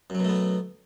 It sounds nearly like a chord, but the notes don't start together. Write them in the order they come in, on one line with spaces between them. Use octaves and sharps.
F#2 F#3 B2 A3 B3